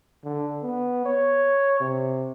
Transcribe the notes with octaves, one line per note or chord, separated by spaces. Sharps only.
D3
B3
C#5
C3